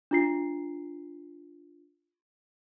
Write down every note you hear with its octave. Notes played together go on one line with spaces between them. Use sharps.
D4 F4 C7